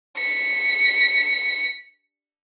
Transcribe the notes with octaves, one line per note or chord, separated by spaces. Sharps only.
B6 C#7